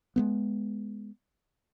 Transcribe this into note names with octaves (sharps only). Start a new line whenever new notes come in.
G#3 A3 B3